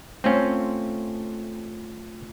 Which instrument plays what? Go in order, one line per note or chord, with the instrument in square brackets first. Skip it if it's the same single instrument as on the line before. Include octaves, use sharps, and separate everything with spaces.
[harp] A3 F4 [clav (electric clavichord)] C4 C#4